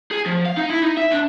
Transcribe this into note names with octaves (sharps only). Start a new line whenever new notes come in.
G#4
F3
F5
D#4
E4
D#4
E5
D4